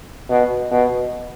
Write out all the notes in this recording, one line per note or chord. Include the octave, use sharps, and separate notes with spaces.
B2
B2